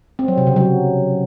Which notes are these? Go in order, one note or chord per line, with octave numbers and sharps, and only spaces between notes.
C4
F#3
C3
C#3
F#3